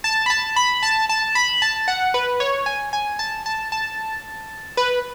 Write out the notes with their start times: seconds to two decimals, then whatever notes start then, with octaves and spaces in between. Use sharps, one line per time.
0.04 A5
0.26 B5
0.30 A5
0.56 B5
0.83 A5
1.09 A5
1.35 B5
1.62 A5
1.88 F#5
2.14 B4
2.40 C#5
2.66 G#5
2.93 G#5
3.19 A5
3.46 A5
3.72 A5
4.77 B4